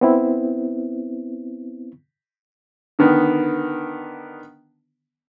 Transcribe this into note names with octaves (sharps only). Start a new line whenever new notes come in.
B3 C4 E4
D3 D#3 B3